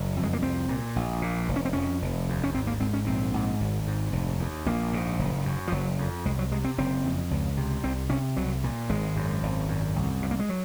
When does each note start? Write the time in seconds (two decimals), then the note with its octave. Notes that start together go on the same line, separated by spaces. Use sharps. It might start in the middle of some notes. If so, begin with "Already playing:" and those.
Already playing: F#1 F#2
0.17 F2
0.23 G#3
0.33 A#3
0.42 C2 C4
0.69 A#2
0.96 A#1
1.22 A#2
1.49 F1
1.56 C#4
1.65 C4
1.73 F2 C#4
2.02 F1
2.29 D#2
2.44 C#4
2.54 G#1 C4
2.67 A#3
2.80 G#2 C4
2.94 C#4
3.07 A#1 C4
3.34 G#2
3.60 G#1
3.87 G#2
4.13 F1
4.39 D#2
4.66 A#1 A#3
4.93 G#2
5.19 F#1
5.45 F#2
5.67 F3
5.72 F#1 F#3
5.98 F2
6.25 C2 G#3
6.39 F#3
6.52 C3 G#3
6.64 C4
6.78 F#1 C4
7.05 F2
7.31 C#2
7.57 C3
7.84 C2 C4
8.10 C3 C#4
8.37 C2 F#3
8.64 A#2
8.90 G#1 G#3
9.17 F#2
9.43 G#1
9.68 F#2
9.96 C2
10.22 C3
10.31 A#3
10.40 G#3
10.49 F#3